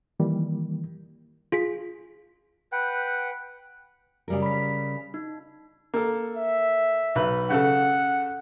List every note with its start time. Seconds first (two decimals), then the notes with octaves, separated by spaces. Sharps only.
0.20 D#3 E3 G3 A#3
1.52 F4 G#4 B6
2.72 B4 F#5 G5
4.28 C#3 G3 A#4
4.42 B5 B6
5.14 D#4
5.94 A#3 A4
6.37 E5
7.15 B1 B4
7.50 C#3 A4 F#5